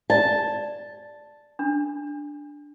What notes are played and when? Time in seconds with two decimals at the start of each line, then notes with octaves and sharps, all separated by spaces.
0.10 D5 A5
1.59 D4